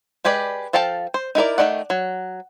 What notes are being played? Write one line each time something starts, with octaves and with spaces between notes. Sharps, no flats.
G#3 G4 G#4 B4 D5
F3 A4 F5 G5 A5
C5
D#4 E4 A#4 D5
D#3 A3 D#4 D5 F#5
F#3